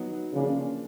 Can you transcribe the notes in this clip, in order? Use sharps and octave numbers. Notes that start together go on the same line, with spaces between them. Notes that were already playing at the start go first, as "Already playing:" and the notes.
Already playing: F#3 B3 D#4
C#3 F3 A#3 D4